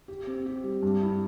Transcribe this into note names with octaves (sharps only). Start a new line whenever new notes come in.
G4
C4
G4
G3
G2
E4